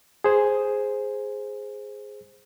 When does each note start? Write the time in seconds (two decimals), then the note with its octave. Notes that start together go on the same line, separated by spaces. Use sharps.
0.24 G#4 C5